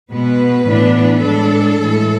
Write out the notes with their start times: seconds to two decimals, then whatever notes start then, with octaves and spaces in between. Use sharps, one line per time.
0.10 B2 G#3 B3 B4
0.66 A2 E3 B3 D4
1.22 A2 G#3 D4 A4
1.78 A2 E3 G#3